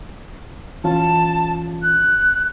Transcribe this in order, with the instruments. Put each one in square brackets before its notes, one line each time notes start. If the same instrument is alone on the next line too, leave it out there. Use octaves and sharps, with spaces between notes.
[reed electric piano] E3 C#4 F4 [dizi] A5
[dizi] F#6